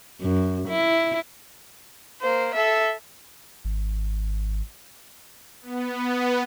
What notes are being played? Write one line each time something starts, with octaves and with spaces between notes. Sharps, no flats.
F#2
E4
A#3 C5
A4 E5
G#1
B3